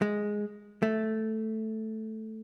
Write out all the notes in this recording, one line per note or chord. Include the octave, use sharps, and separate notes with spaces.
G#3
A3